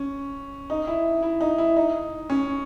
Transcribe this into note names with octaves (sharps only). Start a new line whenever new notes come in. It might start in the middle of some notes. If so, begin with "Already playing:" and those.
Already playing: C#4
D#4
E4
E4
D#4
E4
D#4
C#4